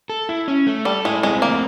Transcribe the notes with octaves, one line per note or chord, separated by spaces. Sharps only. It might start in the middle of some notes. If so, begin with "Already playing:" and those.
A4
E4
C#4
A3
G3 A4
G#3 E4
G#3 C4
A3 A#3